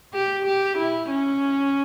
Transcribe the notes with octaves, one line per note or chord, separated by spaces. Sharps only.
G4
G4
E4
C#4